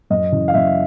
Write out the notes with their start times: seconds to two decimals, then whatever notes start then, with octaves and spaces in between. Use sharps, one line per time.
0.10 F#2 D#5
0.32 C#3 E3
0.48 F5
0.54 F#2 E5